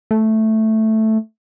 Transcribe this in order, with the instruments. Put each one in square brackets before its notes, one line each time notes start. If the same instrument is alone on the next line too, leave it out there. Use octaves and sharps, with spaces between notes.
[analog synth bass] A3